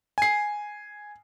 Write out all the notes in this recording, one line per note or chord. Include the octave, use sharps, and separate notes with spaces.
G#5 C7